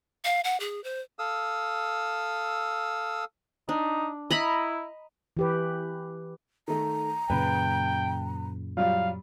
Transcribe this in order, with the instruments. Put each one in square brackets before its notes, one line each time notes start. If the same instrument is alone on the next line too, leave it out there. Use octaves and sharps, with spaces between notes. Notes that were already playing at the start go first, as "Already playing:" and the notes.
[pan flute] F5
F#5
G#4
C5
[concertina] A4 F5 D#6 E6
[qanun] D4 [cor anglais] D#4
[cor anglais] E4 [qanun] D#5 A#5 B5
[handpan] E3 G4 B4
[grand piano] D#3 A3 [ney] A#5
[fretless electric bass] F#2 A#2 C#3 [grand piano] B4 [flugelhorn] G5
[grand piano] F#3 G3 F4 [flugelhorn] F5